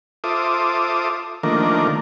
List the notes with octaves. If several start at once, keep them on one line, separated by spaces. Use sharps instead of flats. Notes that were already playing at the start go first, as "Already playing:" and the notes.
F4 A4 C5 E5 D6 D#6
D#3 F3 A3 A#3 D4 A#4